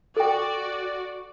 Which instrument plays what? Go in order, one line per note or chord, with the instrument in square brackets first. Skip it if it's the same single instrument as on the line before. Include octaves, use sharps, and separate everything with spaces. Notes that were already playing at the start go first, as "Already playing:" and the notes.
[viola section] F#4 D5 [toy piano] A4 G5